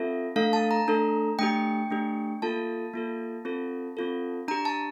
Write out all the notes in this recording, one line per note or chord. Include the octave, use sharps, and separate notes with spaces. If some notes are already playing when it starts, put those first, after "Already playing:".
Already playing: C4 F4 A4 E5
A3 D4 A4 F5
A5
A#5
A3 D4 A4
A3 D4 G4 G5
A3 D4 G4
A#3 F4 A4 A5
A#3 F4 A4
C4 F4 A4
C4 F4 A4
D4 G4 A#5
A5